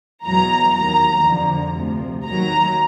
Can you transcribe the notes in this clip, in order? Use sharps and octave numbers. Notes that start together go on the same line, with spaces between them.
E2 B2 F#3 A#5
D#2 D#3 F#3 A#5
F2 D3 F3
D2 C3 F3
D#2 D#3 F#3 A#5